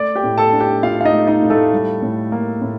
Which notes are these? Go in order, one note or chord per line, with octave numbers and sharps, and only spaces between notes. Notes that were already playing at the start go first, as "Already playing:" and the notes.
Already playing: A3 D5 D6
G4 G5
A2
A4 A5
D4
G4 G5
A2 F4 F5
F5
D#4 D#5
A3
D#4 D#5
A2
A3 A4
G3
A2
A#3
A2